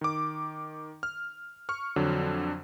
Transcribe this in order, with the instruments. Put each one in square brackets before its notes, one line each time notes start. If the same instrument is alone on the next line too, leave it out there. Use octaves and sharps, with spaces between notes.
[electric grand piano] D#3 D6
F6
C#6 F6
F2 D3 F#3